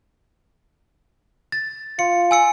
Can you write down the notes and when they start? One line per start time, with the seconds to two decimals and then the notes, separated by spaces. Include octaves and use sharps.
1.52 A6
1.99 F4 C#7
2.31 G#5 E6 C#7